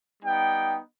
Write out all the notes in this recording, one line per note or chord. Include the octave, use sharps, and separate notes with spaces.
G3 B3 D#4 G5